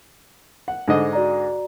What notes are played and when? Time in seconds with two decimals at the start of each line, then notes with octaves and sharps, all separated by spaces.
0.68 F#5
0.88 G#2 D3 D4 A4 C5 D#5
1.13 F#4 D5 A#5